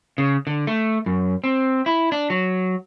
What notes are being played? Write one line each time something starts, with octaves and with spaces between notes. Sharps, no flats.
C#3
D3
A3
F#2
C4
E4
D4
F#3